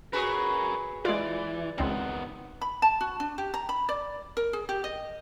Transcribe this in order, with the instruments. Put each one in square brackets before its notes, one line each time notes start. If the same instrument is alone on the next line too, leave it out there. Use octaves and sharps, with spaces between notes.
[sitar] F#4 G#4 B4 [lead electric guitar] A#4 C#5
[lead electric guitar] E3 [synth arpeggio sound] G#3 F4 [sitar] D5
[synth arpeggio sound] C#2 C4 [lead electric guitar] D#3 B3
[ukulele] B5
A5
F#4
D4
G4
A#5
B5
D5
A#4
G#4
G4
D#5